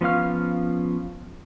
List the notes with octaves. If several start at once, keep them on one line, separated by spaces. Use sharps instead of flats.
F3 B3 C#4 F5 F6